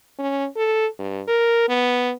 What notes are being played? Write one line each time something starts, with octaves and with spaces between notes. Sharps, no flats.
C#4
A4
G2
A#4
B3